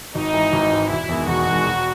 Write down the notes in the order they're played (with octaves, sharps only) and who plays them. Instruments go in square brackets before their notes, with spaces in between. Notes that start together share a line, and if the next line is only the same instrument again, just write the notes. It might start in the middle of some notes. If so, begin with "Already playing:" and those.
[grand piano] G#1 [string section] D#4
[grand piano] G#2 E3
G#1
G#2 E3
[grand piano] E1 [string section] E4
[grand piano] E2 D#3 G#3
[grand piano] E1 [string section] F#4
[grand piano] E2 D#3 G#3
E1